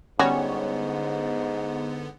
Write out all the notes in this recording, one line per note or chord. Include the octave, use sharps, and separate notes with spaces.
G#2 D3 G3 B3 C#4 F#4 C#5